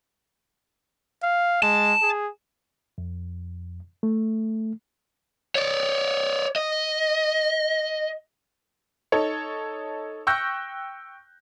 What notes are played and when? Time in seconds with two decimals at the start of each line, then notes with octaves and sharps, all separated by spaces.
1.23 F5
1.63 G#3 A5
2.02 G#4
2.98 F2
4.03 A3
5.55 C#5 D5
6.56 D#5
9.12 D#4 A4 C#5
10.27 G5 C#6 E6 F#6 G6 A#6